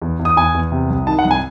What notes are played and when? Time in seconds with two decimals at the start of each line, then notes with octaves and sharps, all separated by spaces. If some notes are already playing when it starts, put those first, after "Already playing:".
0.02 E2
0.19 E2
0.25 D#6
0.36 E2 G#5
0.54 E2
0.72 C3
0.90 C2
1.07 D#3 A5
1.19 F#5
1.25 C2
1.31 G#5